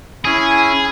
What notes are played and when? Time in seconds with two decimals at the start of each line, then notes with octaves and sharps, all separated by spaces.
0.25 C#4 E4 G#4 G#5